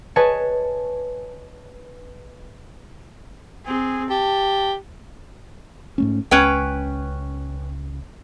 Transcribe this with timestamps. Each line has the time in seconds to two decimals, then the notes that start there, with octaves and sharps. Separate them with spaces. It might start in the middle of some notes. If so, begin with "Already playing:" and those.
0.16 G#4 B4 C#5 D#5 G#5 A5
3.65 C4 G#4
4.10 G4 A5
5.98 G#2 A3 C#4
6.31 C#2 C#4 B4 G5